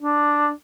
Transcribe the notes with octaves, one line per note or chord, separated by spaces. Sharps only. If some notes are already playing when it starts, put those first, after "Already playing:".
D4